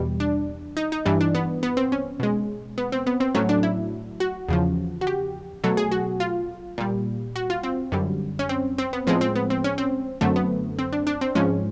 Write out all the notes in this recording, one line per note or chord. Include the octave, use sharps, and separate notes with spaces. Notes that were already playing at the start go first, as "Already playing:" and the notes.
Already playing: E2 B2 G3
D4
D#4
D#4
G2 E3 G3 D4
D4
B3
B3
C4
C#4
B2 G#3
B3
C4
B3
C4
A2 F#3 A3 C#4
D4
E4
F#4
E2 C#3 F3
F#4
G4
B2 F#3 A3 A4
G#4
F#4
F4
A#2 G3
F#4
F4
C4
F#2 D3 G3
C#4
C4
C4
B3
A2 F3 G#3 C4
C4
B3
C4
C#4
C4
F#2 D3 F#3 A3 C4
B3
C4
D4
D4
C4
G#2 F3 G#3 C#4